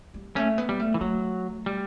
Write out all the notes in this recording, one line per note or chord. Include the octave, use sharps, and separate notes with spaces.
G3
A3 C#4
B3
G3
A3
E3
F#3 A3
G3